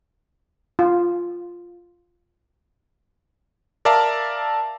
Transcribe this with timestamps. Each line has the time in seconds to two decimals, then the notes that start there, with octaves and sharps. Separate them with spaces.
0.79 F4
3.85 A#4 D5 E5 F5 A5 A#5